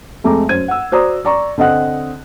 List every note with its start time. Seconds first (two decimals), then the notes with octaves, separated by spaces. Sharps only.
0.24 F2 G#3 A3 A#5 D6
0.49 F#2 C5 G#6 D#7
0.68 F#5 E6
0.92 F#4 C5 D5 A#5 D#6
1.25 D5 A#5 C#6
1.58 D3 C4 D#5 F#5 F#6